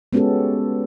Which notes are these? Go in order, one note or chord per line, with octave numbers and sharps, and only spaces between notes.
G#3 B3 C#4 F#4 G4 A4